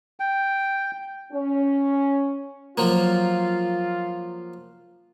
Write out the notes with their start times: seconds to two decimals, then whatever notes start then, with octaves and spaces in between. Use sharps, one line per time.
0.20 G5
1.32 C#4
2.78 F3 F#3 A#3 F4